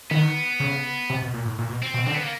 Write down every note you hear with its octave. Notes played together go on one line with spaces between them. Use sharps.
D#3 B3
C#3
C3
B2
A#2
A2
A#2
B2
C4
B2
D3 C4
B3
A#3